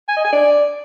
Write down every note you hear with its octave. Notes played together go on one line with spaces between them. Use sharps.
G#5
D#5
G#5
D5